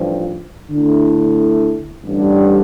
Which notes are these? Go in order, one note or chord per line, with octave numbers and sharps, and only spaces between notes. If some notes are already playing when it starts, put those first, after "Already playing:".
Already playing: A1 G2 F3
D3 A3 E4
A1 G2 D3 G3